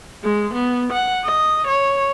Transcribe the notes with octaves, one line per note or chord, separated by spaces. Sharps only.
G#3
B3
F#5
D#5
C#5